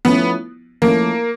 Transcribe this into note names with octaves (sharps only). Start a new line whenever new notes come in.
F3 A3 B3 C#4 E4
F3 A3 A#3 C#4 E4